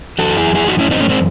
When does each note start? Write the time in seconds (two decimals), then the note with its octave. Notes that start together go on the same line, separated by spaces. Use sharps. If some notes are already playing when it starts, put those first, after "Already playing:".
0.19 F#2 E3 F#4 A4
0.37 E4 G#4
0.55 E4 G#4
0.67 D#4 F#4
0.79 C#4 E4
0.91 C4 D#4
1.00 A3 C#4
1.10 G#3 C4